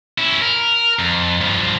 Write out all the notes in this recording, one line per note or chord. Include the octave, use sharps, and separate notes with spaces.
C#4 E4
A#4
F2
G2 F3